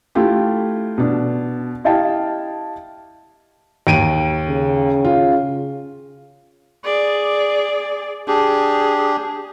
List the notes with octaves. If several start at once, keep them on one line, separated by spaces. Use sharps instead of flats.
A3 E4 F4 G4
B2 D4
E4 G4 D#5 F5 G5 A5
D#2 D7 D#7
C#3
F4
G#4 D5
D4 G4 G#4